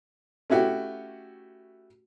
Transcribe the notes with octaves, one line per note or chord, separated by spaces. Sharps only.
A3 C#4 E4 F#4 G4